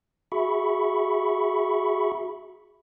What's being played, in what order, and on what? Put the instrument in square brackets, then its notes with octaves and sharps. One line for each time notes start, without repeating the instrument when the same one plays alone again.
[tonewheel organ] F#4 G#4 E5 B5 C#6